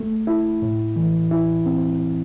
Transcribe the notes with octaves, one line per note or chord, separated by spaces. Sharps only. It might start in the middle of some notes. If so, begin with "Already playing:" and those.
Already playing: A3
E4
A2
E3
E4
C4